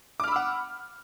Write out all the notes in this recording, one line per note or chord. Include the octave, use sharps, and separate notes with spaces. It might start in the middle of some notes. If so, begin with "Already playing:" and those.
F#5 B5 D6 E6 F6